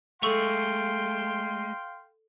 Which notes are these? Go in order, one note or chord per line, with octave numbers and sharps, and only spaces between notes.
G#3 A3 A4 F5 G5 C6 C#6 F7